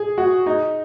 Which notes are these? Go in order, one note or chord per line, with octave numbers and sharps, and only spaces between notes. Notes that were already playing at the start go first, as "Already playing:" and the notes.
Already playing: G#4
F#4
D#4